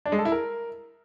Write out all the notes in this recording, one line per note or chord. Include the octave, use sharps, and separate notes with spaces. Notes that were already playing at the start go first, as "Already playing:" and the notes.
D4
G#3
A4
E4
A#4